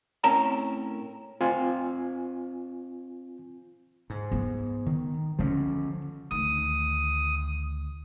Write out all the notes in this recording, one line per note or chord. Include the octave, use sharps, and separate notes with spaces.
A2 C4 C#4 A#4 A5 A#5
C4 F4 G#5
G#2
B3
D#3
D3 F3 B3 C#4
D2 D#3 D#6